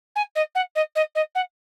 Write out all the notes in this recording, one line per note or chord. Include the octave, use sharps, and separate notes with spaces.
G#5
D#5
F#5
D#5
D#5
D#5
F#5